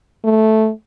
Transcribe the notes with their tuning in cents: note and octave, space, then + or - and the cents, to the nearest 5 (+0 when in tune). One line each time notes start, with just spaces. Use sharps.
A3 -5